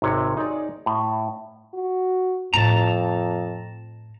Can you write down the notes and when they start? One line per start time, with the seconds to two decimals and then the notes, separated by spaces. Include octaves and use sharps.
0.02 G#1 C3 C#5
0.37 D#4 G#4 C#5 D5
0.86 A2
1.74 F#4
2.54 F2 A2 E4 A5 A#5